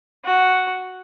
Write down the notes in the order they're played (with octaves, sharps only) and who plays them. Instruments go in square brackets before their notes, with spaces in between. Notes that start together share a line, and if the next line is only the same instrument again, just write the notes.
[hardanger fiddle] F#4